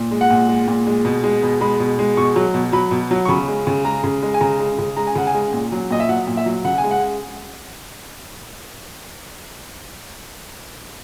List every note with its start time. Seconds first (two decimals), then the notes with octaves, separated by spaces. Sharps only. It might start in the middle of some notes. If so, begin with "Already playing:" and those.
Already playing: A#2
0.11 G#3
0.21 F#5
0.30 A#2
0.49 G#3
0.68 A#2
0.87 G#3
1.05 B2
1.24 G#3
1.43 B2
1.61 G#3 B5
1.80 B2
1.99 G#3
2.17 B2 C#6
2.36 F#3
2.54 B2
2.72 F#3 B5
2.91 B2
3.11 F#3
3.25 C#6
3.28 C#3 B5
3.48 G#3
3.67 C#3
3.85 G#3 A#5
4.04 C#3
4.22 G#3
4.34 G#5
4.40 C#3 A#5
4.59 G#3
4.78 C#3
4.97 G#3 A#5
5.07 G#5
5.15 C#3 F#5
5.27 G#5
5.34 G#3
5.53 A#2
5.72 F#3
5.91 A#2 D#5
6.00 E5
6.09 F#3 F#5
6.27 A#2
6.37 E5
6.46 F#3
6.65 C#3 F#5
6.78 G#5
6.84 G#3
6.91 F#5